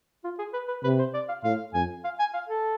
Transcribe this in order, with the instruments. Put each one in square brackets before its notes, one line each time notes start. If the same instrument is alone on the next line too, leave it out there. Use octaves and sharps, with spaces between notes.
[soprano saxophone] F4
G#4
B4
B4
[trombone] C3 [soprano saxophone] B4
[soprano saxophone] C5
D5
F5
[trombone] A2 [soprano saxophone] F5
[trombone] F2 [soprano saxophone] G#5
[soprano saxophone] F5
G#5
F5
A4